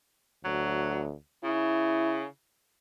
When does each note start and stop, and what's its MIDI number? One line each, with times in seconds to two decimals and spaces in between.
0.45 1.14 38
0.45 1.05 54
1.44 2.25 49
1.44 2.26 64